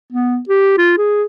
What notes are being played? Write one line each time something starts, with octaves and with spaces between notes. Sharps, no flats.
B3
G4
F4
G#4